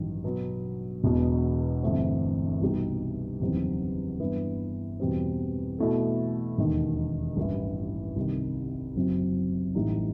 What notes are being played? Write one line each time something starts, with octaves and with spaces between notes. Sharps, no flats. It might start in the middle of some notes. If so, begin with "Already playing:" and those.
Already playing: A1 G2 D#3 F#3
B2 F#3 B3
E1 E2 B2
G1 G2 E3 A3 C4
C2 B2 G3 D#4 G4
F#1 E2 D#3 G3 C4
G2 E3 B3
E2 B2 G3 C4
B2 A3 E4 A4
E1 D#2 D#3
A1 G2 E3
C2 C3 D#3
F#1 F#2 F#3 C4
A1 A2 G3 D#4